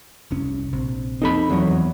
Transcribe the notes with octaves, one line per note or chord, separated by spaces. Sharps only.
F1 C2 C#4
A#1 C3
F2 F3 C4 D#4 A4 B5
E2 F#3